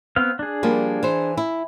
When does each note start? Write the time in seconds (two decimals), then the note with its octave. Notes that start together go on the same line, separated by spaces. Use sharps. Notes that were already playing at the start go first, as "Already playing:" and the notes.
0.16 B3 C4 F5
0.39 D4 G#4
0.63 F3 G3 A#3
1.03 E3 C5
1.37 E4